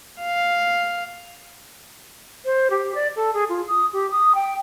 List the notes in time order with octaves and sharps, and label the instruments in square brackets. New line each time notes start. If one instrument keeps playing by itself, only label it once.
[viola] F5
[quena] C5
G4
D5
A4
G#4
F4
D#6
G4
D#6
G5